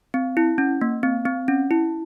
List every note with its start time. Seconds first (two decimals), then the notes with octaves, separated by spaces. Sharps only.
0.14 C4
0.37 E4
0.58 C#4
0.81 A#3
1.03 C4
1.25 C4
1.48 C#4
1.71 E4